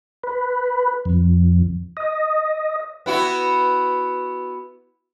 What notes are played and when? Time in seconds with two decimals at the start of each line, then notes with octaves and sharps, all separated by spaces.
0.23 B4
1.05 F2
1.97 D#5
3.06 B3 E4 F#4